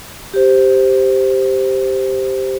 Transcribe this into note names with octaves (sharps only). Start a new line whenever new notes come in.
G4 C5